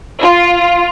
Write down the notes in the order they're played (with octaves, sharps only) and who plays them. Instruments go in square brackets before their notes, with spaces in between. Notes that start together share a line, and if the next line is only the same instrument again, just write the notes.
[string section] F4